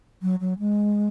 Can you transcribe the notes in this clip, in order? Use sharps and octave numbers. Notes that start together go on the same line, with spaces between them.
F#3
F#3
G#3